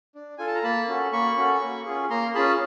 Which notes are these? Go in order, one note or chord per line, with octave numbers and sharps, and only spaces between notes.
D4
F4 A4 G#5
A5
A#5
A#3 A5 B5
C#4 F#4 A4
A#3 B5 C#6
C#4 F#4 A4
A#3
C#4 F4 G#4
A#3 A#5 C6
C#4 F4 G#4 A5 B5